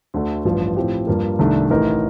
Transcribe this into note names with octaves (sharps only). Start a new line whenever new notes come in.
D2 D3 A3
A1 G2 F3
A2 F3 C4 G4
G2 F3 A#3
C2 C3 D#3 A3 D4
A1 A2 A3 D#4 A#4